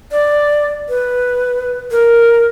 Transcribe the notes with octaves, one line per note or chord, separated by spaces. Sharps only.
D5
B4
A#4